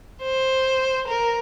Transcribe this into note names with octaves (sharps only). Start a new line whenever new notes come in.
C5
A#4